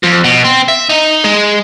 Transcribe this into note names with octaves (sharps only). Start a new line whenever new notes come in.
F2
B2
C4
E5
D#4
G#3